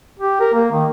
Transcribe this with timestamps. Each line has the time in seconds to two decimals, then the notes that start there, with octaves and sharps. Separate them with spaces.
0.20 G4
0.40 A#4
0.54 A#3
0.72 D#3